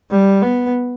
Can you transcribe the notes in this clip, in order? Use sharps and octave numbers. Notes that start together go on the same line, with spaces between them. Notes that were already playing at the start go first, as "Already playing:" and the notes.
G3
B3